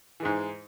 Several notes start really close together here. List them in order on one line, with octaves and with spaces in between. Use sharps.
E3 G#3 G#2